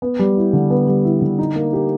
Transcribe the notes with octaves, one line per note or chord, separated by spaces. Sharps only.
B3
G3
E4
D3
B3
G3
E4
D3
D#4
A#3
G4